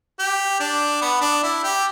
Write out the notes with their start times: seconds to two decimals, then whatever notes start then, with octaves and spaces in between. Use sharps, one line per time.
0.19 G4
0.60 D4
1.01 B3
1.21 D4
1.43 E4
1.63 G4